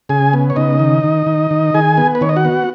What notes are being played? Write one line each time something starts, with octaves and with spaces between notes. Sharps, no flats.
C#3 G#4 G#5
B3
C#5
C#3 D#4 D#5
D#3
D#3
D#3
D#3
D#3 G#4 G#5
B3
B4
D#3 C#5
D#5
F#4 F#5
B3